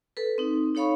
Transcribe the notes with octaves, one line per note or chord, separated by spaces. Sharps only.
A4 B4
C4 D#4
D#4 A4 C#5 F5 B5 C#6